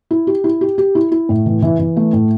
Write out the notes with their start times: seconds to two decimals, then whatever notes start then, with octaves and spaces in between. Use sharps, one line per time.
0.11 E4
0.27 G4
0.44 E4
0.61 G4
0.78 G4
0.95 E4
1.12 E4
1.29 A2
1.46 E3
1.62 E3
1.79 E3
1.96 A3
2.13 A2